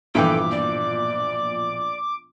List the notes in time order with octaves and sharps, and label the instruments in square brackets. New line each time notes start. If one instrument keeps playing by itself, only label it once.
[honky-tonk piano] A#1 B2 F3 [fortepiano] G2 E3 G5 [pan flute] A4 [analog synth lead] D6
[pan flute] D5